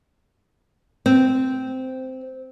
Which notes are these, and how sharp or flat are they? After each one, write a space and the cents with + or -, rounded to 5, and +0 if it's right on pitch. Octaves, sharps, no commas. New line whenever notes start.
C4 -10